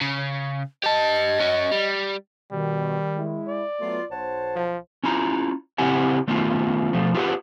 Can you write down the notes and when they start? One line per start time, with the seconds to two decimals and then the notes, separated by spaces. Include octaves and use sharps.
0.01 C#3
0.84 G4 D#5 A5
1.41 C#4 F#4
1.72 G3
2.52 B2 D#3 G3
3.17 G#3 E4
3.47 D5
3.80 F#3 A3 B3 F4
4.11 B1 C5 C#5 F#5 A5
4.55 F3
5.04 C#4 E4 F4 A#5
5.78 C#3 C4 E4 G4 F#5 G#5
6.28 D#3 A3 B3 C#4 F4
6.93 B2 F3 A3
7.15 F4 G4 G#4 B4 E5 F#5